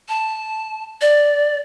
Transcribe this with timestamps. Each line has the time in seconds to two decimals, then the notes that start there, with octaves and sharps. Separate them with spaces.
0.09 A5
1.01 D5